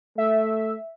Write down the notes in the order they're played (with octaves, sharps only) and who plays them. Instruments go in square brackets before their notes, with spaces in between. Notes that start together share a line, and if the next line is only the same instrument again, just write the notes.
[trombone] A3 [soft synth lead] E5